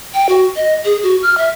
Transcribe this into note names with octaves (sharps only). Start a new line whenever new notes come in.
G5
F#4
D#5
G#4
F#4
F6
E5